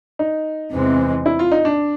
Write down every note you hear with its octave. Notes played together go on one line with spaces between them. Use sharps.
D#4
E2 C3 E3 G#3 C4
E4
F4
D#4
D4